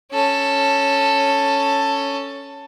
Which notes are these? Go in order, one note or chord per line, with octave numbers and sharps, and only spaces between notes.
C#4 A4